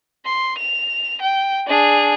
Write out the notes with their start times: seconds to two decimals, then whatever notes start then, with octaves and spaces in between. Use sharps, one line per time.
0.25 C6
0.58 F7
1.21 G5
1.67 D4 G#4